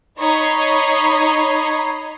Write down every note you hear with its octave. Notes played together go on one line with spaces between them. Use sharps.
D#4 C#5 D#5 A#5 B5 C7